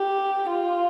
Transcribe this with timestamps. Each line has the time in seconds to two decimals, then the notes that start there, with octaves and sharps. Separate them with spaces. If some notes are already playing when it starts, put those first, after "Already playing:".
Already playing: G4
0.49 F4